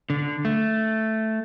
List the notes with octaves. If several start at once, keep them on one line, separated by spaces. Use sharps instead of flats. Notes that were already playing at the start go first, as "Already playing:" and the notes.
D3
A3